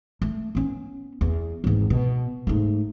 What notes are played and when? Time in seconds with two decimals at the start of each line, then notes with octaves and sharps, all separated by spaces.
0.22 A3
0.55 B3 C#4
1.21 E2
1.64 G#1 E2
1.90 B2
2.47 G#2 A3